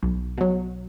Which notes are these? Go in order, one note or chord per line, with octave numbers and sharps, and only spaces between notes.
B1
B2 F#3